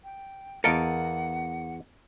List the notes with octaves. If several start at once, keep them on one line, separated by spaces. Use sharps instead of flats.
G5
E2 A#4 D#5 F5 F#5 A5 C#7 D7